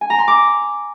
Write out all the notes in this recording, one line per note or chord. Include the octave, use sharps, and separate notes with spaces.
G#5
A#5
C6
D6